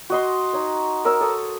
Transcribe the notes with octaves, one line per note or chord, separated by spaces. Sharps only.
F#4 D#5 C6
D#4 C#5
A#4 C#5 E6
A4 C#5 D#6